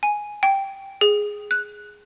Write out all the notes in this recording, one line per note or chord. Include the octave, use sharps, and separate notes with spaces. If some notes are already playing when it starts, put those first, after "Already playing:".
G#5
G5
G#4
F#6